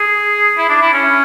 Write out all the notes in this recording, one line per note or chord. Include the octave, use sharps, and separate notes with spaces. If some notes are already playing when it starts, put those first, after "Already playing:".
Already playing: G#4
E4
D4
E4
C#4